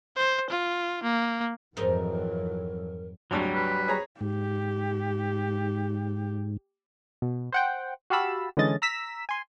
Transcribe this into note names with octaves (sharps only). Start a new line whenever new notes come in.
C5
F4
A#3
F2 G#2 E3 F#3 D#4 A#4
G#1 D2 F#3 G3 D4
B4
G#4 C#5 A#5
G#2 G4
B2
C5 F#5 G5
F#4 G4 F5 A5 B5 E6
D3 E3 G#3 C#4 D#5 A6
A#5 E6 B6 E7
G#5 C6